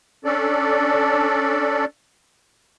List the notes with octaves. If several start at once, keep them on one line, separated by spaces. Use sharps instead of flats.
C#4 D4 A4 D5